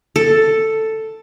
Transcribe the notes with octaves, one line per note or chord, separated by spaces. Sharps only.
A4